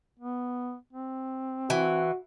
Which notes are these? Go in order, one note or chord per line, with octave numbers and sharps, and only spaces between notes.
B3
C4
E3 F#4